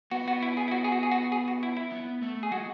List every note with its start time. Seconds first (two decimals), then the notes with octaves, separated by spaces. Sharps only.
0.11 B3 F#4
0.28 F#4
0.43 E4
0.57 G#4
0.68 E4
0.72 F#4
0.84 G#4
0.92 F#4
1.03 G#4
1.12 F#4
1.32 G#4
1.48 F#4
1.63 E4
1.77 E4
1.92 B3
2.23 A3
2.43 G#4
2.52 G#3 F#4